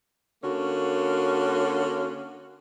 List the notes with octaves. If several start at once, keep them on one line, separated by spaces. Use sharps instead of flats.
D3 A#3 C#4 F#4